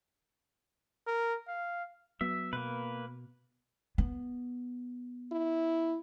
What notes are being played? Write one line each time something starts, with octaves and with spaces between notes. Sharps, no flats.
A#4
F5
F#3 B3 E5
B2 A#3 B4
B3
E4